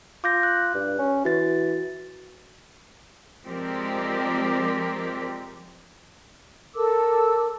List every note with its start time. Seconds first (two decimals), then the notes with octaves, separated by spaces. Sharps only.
0.24 F4 D6 G6 A#6
0.43 F#6
0.74 G2
0.99 C#4
1.25 E3 F#4 A6
3.44 F3 G#3 C4 G4 A#4 D5
6.75 A4 A#4 D6 E6